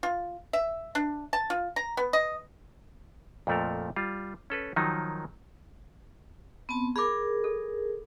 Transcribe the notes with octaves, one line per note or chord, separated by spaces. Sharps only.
F4
E5
D4
A5
F4
A#5
B3
D#5
F2 A#2 F3 A3 A4 A#4
G3 F4
C#4 A4 B4
D#3 F3 F#3 D#4
B3 C4 A5
G#4 A#4 B5 D6
A4